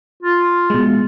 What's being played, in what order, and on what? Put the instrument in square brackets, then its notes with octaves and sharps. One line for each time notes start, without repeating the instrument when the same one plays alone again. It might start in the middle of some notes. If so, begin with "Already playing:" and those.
[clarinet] F4
[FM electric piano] B2 G#3